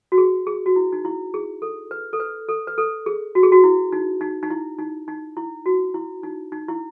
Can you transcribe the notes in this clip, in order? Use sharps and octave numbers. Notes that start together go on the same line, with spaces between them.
F#4
G#4
G#4
F#4
E4
D#4
E4
G#4
A4
B4
A4
B4
A4
B4
A4
G#4
F#4
G#4
F#4
E4
D#4
D#4
D#4
E4
D#4
D#4
E4
F#4
E4
D#4
D#4
E4